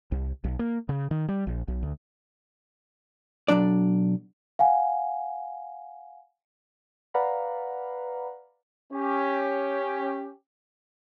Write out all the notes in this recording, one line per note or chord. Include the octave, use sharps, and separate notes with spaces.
C2
B1
A#3
C#3
D#3
G3
A#1
B1
D2
B1 G2 F#3 D4 D5
F5 F#5 G#5
B4 D5 F5 F#5 A#5 B5
C#4 G4